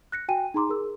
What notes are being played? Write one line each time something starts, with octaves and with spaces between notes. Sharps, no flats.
F#6 A#6 C#7
F#4 G5 G#5 D#7
D#4 G#4 A#5 C6 D6
G#4 A#4 E6